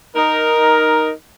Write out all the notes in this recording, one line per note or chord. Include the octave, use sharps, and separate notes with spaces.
D#4 A#4